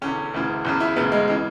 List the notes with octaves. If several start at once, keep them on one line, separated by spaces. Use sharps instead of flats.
E1 E2 D3 C#4
E1 D2 C#3 E3
F#1 E2 C#3
E4
E1 D2 C#3 B3
G#3
C#3 E3 G#3